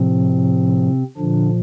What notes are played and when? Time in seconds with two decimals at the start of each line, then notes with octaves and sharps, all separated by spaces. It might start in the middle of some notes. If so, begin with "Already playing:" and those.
Already playing: A2 C3 F3 C4
1.17 A#2 D3 F3 D4